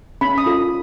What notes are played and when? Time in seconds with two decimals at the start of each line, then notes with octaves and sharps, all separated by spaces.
0.21 C#4 B5
0.38 D#6
0.46 F4 A4